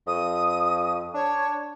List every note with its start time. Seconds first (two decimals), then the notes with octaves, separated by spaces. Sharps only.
0.07 F2 D#6
1.14 D4 C#5